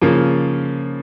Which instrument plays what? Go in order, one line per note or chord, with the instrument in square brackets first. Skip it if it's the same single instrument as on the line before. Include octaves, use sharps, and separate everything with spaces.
[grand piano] C#3 F3 A#3